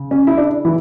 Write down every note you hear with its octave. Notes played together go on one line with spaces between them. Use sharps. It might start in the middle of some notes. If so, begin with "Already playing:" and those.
Already playing: C#3
C#4
E4
D4
E3 E4